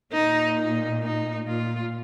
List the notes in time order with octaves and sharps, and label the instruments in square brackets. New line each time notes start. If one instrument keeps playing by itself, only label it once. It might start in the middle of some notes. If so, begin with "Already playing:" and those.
[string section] A#2 [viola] D#4
[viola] D#4
D#4
[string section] A#2 [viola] F4